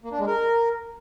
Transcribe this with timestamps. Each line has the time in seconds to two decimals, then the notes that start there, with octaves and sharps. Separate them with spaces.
0.04 A#3
0.12 D4
0.19 G#3
0.27 A#4